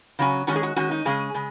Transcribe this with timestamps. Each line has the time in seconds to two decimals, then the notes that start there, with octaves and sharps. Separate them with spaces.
0.19 C#3 F#3 C#4
0.47 D#3 G#3 C#4 F#4
0.56 G#4
0.63 F#4
0.76 D#3 G#3 C#4 F#4
0.91 D#4
1.05 C#3 G#3 C#4 G#4
1.34 C#3 G#3